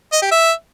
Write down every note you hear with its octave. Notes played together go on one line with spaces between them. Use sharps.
D#5
G4
E5